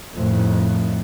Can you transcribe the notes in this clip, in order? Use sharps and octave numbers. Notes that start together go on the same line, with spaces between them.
F2 A2 D#3